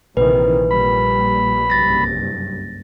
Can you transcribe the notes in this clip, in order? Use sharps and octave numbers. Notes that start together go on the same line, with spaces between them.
A#1 C3 D#3 E3 B4
A#2 G3 B5
F#1 C2 G2 A6 A#6